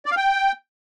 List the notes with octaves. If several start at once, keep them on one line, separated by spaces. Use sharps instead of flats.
D5
F5
G5